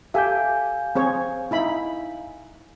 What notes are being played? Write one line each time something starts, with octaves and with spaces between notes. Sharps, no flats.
G4 A4 E5 F5 G#5 G6
C4 G#4 C#5
D#4 E4 B5